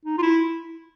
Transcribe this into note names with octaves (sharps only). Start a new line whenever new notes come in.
D#4
F4
E4